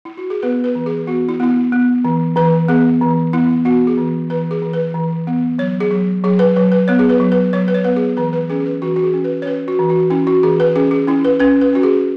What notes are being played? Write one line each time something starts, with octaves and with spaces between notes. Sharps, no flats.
E4
F#4
G#4
B3 B4
B4
E3
G#4
B3 F#4
E4
B3 E4
B3
E3
E3 B4
B3 G#4
E3
B3 E4
B3 F#4
G#4
E3
E3 B4
G#4
E3
B4
E3
B3
F#3 C#5
G#4
F#3
F#3 G#4
B4
F#3 B4
B4
B3 C#5
G#4
B4
F#3
B4
F#3 C#5
B4
C#5
B3 B4
G#4
E3 B4
B4
C#4 G#4
G#4
B4
E3 F#4
F#4
G#4
C#4
B4
C#5
C#4 B4
F#4
E3
F#4
C#4 E4
F#4
E3 G#4
B4
C#4 G#4
G#4
C#4 E4
B4
C#4 B4
B4
C#4 F#4
G#4